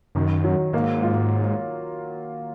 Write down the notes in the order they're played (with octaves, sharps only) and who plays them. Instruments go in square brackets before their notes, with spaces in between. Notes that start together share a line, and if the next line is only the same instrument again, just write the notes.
[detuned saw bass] F#2 [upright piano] D#3
[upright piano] F#3
[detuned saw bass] G#2 [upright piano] A#3
[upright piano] F4